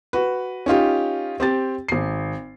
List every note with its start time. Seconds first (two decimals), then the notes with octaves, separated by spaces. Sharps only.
0.13 F#4 B4
0.66 C#4 D#4 F4 G4
1.40 C4 G4 A6
1.89 G#1 C7